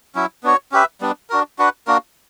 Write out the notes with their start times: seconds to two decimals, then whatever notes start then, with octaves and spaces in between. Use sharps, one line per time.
0.15 F#3 C#4 E4
0.43 B3 D4 F#4 C#5
0.72 C#4 G4 B4 E5
1.01 G3 B3 D4
1.30 D4 F#4 A#4
1.59 D4 F#4 B4 F#5
1.87 A#3 D4 F#4 A#4